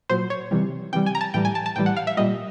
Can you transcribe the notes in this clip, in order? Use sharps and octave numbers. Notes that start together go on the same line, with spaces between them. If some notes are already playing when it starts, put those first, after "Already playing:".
A#2 F#3 C5
C#5
C3 E3 G3
C3 E3 G3 G5
G#5
A#5
A5
A2 E3 G3 G5
G#5
A5
A5
A2 E3 G3 G5
F#5
F5
E5
A#2 G3 D#5